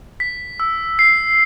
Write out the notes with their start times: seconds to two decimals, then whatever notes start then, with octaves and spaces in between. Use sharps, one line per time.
0.20 B6
0.60 E6
0.99 C7